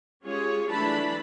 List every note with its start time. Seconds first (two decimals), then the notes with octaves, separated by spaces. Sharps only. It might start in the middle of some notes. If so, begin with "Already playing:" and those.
0.23 G#3 C#4 F4 G4 G#4 C#5
0.68 E3 F#3 A3 D4 A5 B5